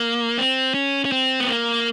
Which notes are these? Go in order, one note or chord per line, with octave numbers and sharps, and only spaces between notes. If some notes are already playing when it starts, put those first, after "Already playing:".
Already playing: A#3
C4
C#4
C#4
C4
B3
A#3